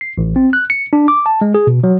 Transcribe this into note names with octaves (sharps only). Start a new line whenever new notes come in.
C7
A1
C4
F#6
C#7
D4
D6
A5
G#3
G#4
B2
F#3